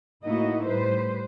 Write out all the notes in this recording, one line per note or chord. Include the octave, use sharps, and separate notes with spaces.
A2 A#3 D#4 E4 F#4 D#5
A2 G3 B4 C5